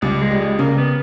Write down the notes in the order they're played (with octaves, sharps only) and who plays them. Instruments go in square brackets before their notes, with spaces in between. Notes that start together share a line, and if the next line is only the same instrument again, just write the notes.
[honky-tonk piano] C#2 [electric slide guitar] G3
[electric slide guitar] G#3
[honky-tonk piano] G3
[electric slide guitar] G#3
[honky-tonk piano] C#3 [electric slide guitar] A#3
[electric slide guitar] B3